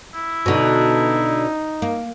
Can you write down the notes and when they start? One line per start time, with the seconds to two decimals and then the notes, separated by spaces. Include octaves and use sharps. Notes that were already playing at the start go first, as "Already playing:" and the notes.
0.15 E4
0.46 B2 D3 D#4
1.82 A#3